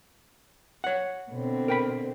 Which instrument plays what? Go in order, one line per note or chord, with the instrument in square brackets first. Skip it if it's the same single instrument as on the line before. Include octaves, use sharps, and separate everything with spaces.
[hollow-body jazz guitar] C#5 F#5
[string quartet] B2 D3 C4
[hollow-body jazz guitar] A#4 G5 B5